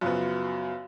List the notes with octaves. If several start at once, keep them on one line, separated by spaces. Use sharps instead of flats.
F#2 C#3 F3 B3